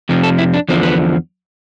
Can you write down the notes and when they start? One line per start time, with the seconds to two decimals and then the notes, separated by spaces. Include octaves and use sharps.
0.09 F2 C3 F3
0.23 A4
0.38 E4
0.54 D4
0.68 E2 D3 F3 C4
0.83 B3